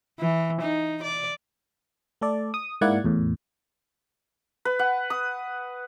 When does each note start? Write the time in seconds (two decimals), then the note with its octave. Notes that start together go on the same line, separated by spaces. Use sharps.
0.19 E3
0.61 D#4
1.03 D5
2.21 A3 A4 D5
2.54 D#6
2.81 G#2 A#3 E4 D5 F#5 G#6
3.04 E2 A2
4.65 B4
4.79 F#5
5.10 D#6